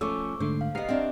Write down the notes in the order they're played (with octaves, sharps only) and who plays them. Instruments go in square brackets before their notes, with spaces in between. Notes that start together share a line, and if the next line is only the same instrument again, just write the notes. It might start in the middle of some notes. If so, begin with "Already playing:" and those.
[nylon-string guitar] F3 A3 C#4 [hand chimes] C#6 D6 E6
[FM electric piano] G#2 D3 A3 [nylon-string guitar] C5
[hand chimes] F5
[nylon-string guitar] B3 F#5 [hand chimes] G4 D#5 [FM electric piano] A#5 F6 C7
[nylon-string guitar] C4 D4 [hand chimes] D#5 E5